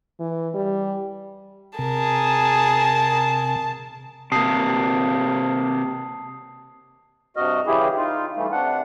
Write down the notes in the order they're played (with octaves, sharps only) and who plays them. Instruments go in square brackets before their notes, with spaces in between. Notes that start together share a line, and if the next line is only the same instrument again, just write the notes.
[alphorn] E3
G3
[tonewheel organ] C3 [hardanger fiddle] G#4 A#4 [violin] A5
[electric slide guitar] C3 A#3 [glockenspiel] A5 D#6 C7
[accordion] G2 C3 F#4 D#5 F6
C#3 E3 G3 E4 G4 G#4
D#4 F4
E3 G3 A3
C3 D4 F#5